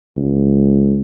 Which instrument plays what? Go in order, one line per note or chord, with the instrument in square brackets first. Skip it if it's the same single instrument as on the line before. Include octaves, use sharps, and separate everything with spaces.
[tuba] C#2